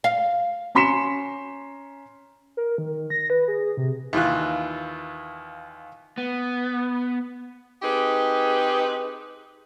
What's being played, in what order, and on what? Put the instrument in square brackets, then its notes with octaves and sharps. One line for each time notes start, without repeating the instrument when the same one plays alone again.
[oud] F5
[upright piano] C#4 A#5 C6 B6 C#7 E7
[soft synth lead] A#4
D#3
A#6
B4
G#4
C3
[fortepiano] D#2 E3 F4 F#6
[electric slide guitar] B3
[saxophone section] C4 D#4 G4 G#4 B4